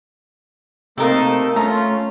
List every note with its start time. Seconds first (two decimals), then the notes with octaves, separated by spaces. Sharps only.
0.98 C3 A3 A#3 D#4 A4 A#4 F5
1.56 A3 C#4 F4 A#5